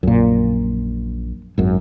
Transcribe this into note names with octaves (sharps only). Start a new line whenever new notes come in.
A#1 F#2 A#2
G#1 F#2